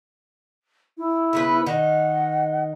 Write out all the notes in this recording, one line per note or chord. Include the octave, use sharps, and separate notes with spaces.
E4
C#3 B3 B4
D#3 D#4 F#5